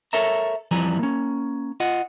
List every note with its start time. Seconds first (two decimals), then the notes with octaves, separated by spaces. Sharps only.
0.13 A4 A#4 C#5 E5 A#5
0.71 F2 E3 F3 G3 G#5 A#5
0.99 A#3 C#4
1.80 F4 D#5 F#5